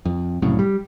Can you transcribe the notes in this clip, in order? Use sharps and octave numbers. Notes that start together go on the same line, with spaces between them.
F2
C2 F#2 A2 C#3
G3